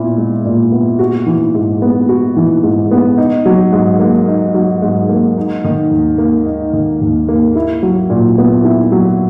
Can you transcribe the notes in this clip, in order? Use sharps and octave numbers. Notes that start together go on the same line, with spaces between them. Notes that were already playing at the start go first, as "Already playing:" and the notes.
Already playing: A#2 B3 E4
G#3
A#2
B3
F#4
E3
G#2
B3
F#4
E3
G#2
B3
D#4
F#3
G#2
A#3
D#4
F#3
G#2
A#3
D#4
D#3
D#2
A#3
D#4
D#3
D#2
A#3
E4
F#3
A#2
B3
E4
F#3